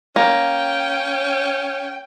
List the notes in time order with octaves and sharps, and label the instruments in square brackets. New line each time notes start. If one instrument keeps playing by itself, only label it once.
[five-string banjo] A#3 [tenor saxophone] C#4 [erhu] G5